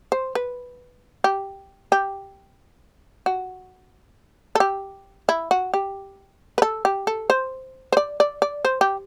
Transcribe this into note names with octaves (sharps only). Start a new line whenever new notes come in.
C5
B4
G4
G4
F#4
A4
G4
E4
F#4
G4
B4
A4
G4
A4
C5
C5
D5
D5
D5
C5
G4